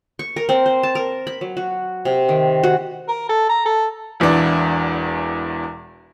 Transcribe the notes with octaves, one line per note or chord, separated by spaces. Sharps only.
C#6
A#4
C4
C5
A5
A#4
B5
F#3
F#4
C3
D#3
F#4
A#4
A4
A#5
A4
E1 E2 E3 D4